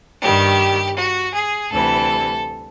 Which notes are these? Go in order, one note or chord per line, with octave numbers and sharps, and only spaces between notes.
G2 D#3 G3 G4
F#4
G#4
D2 C3 E3 G3 A4